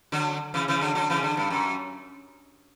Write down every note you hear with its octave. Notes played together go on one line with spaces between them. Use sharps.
D3 F#3
C#3 E3
C#3 E3
D3 F#3
D3 F#3
C#3 E3
D3
G2
F#2